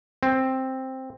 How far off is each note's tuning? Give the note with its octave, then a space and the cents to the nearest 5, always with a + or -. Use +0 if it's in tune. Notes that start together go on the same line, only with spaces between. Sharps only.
C4 +5